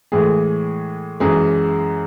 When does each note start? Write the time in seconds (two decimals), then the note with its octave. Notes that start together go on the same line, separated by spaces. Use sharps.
0.12 A2 E3 G#3 G#4
1.20 F#2 E3 G#3 G#4